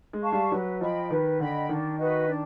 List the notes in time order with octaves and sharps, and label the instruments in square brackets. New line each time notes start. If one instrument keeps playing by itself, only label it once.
[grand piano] G#3
[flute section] F5 A5 C#6
[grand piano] G3
[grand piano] F#3 [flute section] B4
[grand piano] F3 [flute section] D#5 G5 B5
[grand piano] D#3 [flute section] B4
[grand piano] D3 [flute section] D#5 G5 B5
[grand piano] D#3 [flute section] D4
[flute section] F#4 B4 D#5
D4